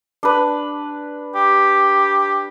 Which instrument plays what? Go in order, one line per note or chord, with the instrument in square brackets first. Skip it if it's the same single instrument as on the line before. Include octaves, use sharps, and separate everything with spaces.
[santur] D4 B4
[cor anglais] G4